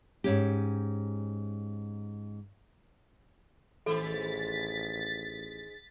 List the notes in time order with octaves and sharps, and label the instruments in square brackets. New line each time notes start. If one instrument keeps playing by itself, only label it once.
[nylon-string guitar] G#2 C#4 G4
[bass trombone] A1 [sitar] D#3 G#3 C5 [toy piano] A4 [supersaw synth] A6 B6